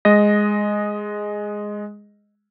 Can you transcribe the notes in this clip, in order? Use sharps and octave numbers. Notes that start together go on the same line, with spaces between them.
G#3 D#5 A#6